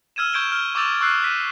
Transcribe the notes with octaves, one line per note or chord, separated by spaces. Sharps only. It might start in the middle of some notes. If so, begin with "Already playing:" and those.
E6 F6 G#6 D#7 E7
C#6 G6 G#6 D7 E7 G7
F6
C#6 D6 E6 G6 A6 F7
C#6 E6 F#6 C7
F#6 B6 D#7